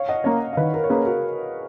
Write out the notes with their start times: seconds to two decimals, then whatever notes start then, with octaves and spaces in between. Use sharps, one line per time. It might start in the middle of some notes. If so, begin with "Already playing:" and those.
Already playing: C#5 F5
0.09 D#5 F#5
0.24 A#3 C#4 C#5 F5
0.53 F5
0.57 D#3 B4 D#5
0.74 A#4 C#5
0.84 C#5
0.90 A#3 C#4 G#4 B4
1.06 F#4 A#4